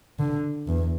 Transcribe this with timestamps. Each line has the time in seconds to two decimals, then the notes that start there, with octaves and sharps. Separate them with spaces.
0.20 D3
0.68 E2